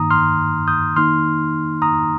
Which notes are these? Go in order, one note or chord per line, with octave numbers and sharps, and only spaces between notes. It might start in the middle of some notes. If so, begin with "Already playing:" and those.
Already playing: G2 D#3 A#3 D#4 A#5 D#6
C6 F6
D#6 G6
D#3 A#3 D#4 C6 F6
A#5 D#6